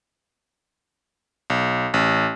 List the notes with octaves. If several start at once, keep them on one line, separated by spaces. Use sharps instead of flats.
B1
A1